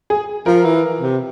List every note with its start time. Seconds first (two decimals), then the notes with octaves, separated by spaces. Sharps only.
0.10 G#4
0.46 F3 A#4
0.65 E3
1.01 C3